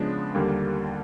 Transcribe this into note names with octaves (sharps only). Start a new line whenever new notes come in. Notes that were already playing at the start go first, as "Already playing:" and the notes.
Already playing: C#3 F3 G#3 B3 D4
D#2 D3 G3 A#3